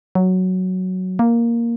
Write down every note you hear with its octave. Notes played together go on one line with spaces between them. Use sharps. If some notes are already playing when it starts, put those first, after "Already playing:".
F#3
A#3